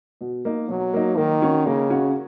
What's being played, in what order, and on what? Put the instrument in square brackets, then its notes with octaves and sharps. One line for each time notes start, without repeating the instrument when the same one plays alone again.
[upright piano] B2
A#3 D#4
[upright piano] B2 [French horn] F#3
[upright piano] A#3 D#4
[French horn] D#3 [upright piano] A#3
[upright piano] C#4 F#4
[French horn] C#3 [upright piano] A#3
[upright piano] C#4 F#4